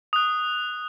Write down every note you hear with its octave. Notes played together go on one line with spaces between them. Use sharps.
D#6 F#6